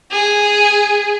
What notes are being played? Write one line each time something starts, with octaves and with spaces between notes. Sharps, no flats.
G#4